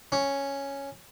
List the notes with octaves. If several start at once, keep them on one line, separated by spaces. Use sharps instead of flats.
C#4